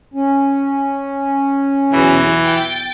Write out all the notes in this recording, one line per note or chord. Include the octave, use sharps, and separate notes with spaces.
C#4
B1 E2 E3 F#4
G5 A6